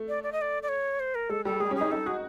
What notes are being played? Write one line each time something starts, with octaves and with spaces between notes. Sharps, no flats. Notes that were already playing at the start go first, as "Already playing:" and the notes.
Already playing: A3
D5
D5
D#5
D5
D5
C#5
C5
A#4
G#3 A4
G3 A4
G#3 G#4
C#4 G#4
D#4
D#4 A4
F#4 G#4